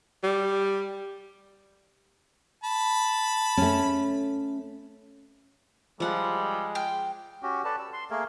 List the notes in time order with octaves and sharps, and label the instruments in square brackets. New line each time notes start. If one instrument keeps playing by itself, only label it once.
[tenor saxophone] G3
[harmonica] A5 B5
[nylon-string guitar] A3 C#4
[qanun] F3 F#5 [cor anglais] G3 [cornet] G#3
[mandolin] G5 F6
[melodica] C#4 F#4 G4
A4 B4 D5 A5
E6
C6
A3 A#3 G#4 A#4